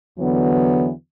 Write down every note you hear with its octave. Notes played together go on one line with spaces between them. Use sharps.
E2 D3 E3 F#3 B3